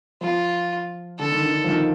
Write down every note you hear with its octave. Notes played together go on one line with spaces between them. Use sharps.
F3 F4
D3 A4
D#3
D3
F3
D#3